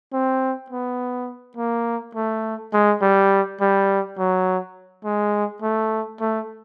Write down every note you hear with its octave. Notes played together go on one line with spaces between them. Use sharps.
C4
B3
A#3
A3
G#3
G3
G3
F#3
G#3
A3
A3